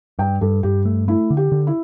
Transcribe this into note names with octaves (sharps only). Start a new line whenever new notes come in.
G2 G5
G2 A4
G2 G4
A3
A3 E4
D3
G4
D3
E4